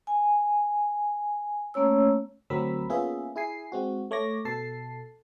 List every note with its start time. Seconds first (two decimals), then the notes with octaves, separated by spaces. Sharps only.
0.07 G#5
1.74 A3 A#3 C#4 C#5 E6
2.50 D2 F#3 C4 A#4 B5 E6
2.89 A#3 B3 C#4 F4 G#4 E5
3.36 E4 G#4 G#5 C7
3.72 G#3 C4 F#4
4.11 A3 C#5 D6 A#6
4.45 B2 A4 A5 C7